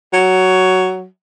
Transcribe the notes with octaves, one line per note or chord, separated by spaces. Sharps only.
F#3